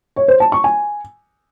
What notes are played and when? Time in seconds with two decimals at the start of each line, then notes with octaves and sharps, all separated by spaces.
0.16 C#5
0.28 C5
0.40 A5
0.52 C#6
0.64 G#5